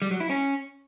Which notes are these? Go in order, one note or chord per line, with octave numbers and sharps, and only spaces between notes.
G3
F#3
E4
C#4